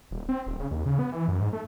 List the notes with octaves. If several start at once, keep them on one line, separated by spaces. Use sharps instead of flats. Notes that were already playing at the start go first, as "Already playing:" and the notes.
D#1
C4
D#1
C#3
D#2
C#3
B3
E3
F#2
G#2
A3